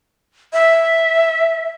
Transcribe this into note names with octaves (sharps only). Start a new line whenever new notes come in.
E5